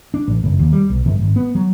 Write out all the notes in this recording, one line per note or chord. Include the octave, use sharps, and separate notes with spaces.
D4
A1
F#1
D#2
G3
B1
G1
G#1
B3
F#3